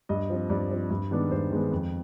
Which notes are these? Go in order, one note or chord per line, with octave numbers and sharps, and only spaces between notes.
G2 D#5
F3 C4
G2 D5
F3 C4
G2
D#3 G#3 B3 D4
G2 C5
D#3 G#3 B3 D4
F2